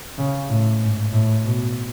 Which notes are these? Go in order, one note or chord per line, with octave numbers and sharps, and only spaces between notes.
C#3
A2
G#2
A2
B2